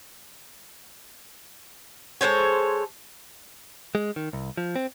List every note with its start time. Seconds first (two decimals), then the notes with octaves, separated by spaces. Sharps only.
2.21 G#3 A4 C5 C#5
3.95 G#3
4.16 D#3
4.33 C2
4.57 F3
4.76 C4